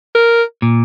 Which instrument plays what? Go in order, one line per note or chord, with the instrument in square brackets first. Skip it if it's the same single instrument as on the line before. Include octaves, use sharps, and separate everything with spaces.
[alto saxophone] A#4
[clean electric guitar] A#2